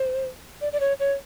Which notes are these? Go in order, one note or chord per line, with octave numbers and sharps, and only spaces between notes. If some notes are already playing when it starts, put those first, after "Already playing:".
Already playing: C5
D5
D5
C#5
C#5